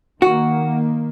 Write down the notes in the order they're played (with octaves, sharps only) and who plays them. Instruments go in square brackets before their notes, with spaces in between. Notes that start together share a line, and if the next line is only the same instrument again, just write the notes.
[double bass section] D#3 A#3 [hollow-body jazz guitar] F#4